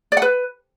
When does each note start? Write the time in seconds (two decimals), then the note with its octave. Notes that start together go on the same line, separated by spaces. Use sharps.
0.12 D5
0.17 F#5
0.22 B4